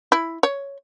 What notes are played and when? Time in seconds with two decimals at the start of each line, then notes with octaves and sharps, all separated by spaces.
0.12 E4
0.43 C#5